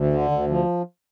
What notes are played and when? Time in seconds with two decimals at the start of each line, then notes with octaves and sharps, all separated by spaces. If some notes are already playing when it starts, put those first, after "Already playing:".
Already playing: D2
0.13 D3
0.31 D2
0.50 F3